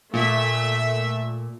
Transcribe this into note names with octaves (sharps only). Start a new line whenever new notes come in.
A#2 A3 E5